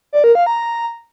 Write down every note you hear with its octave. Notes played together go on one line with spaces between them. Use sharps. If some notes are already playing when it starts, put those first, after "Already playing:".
D5
A#4
F5
A#5